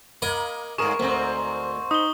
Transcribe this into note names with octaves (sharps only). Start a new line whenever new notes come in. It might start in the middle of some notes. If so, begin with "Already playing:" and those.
A#3 A#4 D#5 B5
G2 G#4 A#4 C#6 D#6 E7
D2 G#2 C4
D#4 D#6 G7